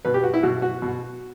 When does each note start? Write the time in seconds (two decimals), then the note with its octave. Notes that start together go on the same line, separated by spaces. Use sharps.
0.05 B2 B4
0.14 G4
0.24 F#4
0.33 E4
0.43 B2 F#4
0.62 F#4
0.82 B2